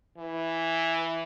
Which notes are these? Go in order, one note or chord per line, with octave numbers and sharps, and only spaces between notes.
E3